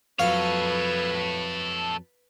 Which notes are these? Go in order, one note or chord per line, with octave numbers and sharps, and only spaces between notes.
F2 F#3 A4 B4 C#5 F5